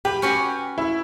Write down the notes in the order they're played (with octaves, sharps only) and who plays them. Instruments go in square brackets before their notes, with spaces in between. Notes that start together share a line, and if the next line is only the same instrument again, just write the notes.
[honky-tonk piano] G4 [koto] B4
[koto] C#4 F#4 B4
[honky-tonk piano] E4